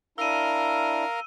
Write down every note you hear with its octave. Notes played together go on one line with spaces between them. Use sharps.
D4 E4 A#4 F5 A#5 E6 D#7